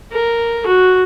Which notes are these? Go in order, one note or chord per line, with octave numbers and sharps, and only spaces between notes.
A#4
F#4